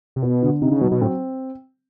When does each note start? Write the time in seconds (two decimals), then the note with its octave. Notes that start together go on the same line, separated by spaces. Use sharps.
0.16 C3
0.22 B2 B3
0.42 D3
0.62 C3 D#4
0.72 C#3
0.81 B2 F#3
0.92 B2
1.01 A2 C4